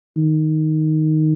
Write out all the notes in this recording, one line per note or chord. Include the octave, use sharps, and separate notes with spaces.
D#3